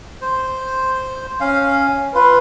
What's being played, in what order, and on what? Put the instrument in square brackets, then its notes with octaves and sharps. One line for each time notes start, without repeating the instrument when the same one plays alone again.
[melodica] C5
C#4 F5
[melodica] F4 F5 C6 [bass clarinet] B4